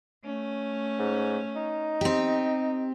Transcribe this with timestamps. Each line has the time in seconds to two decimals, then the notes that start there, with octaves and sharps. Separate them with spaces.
0.23 A3 C#4
0.99 G#2
1.56 D#4
2.01 C4 G4